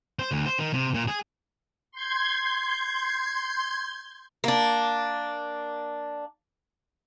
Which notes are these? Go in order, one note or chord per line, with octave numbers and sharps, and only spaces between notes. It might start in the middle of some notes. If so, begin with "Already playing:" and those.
C5
D2
C5
D#3
C3
A#2
G#4
C6 G6 G#6
A#3 D4